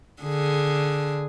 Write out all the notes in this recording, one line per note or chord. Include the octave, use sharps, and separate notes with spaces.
D3 G#4